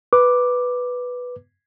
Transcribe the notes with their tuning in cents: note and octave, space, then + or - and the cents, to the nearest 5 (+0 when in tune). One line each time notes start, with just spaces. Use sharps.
B4 +0 D6 +0